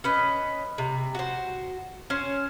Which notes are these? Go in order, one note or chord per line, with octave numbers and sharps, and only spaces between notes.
C#4 B4 D#5
C3
F#4 C5
C#4 C5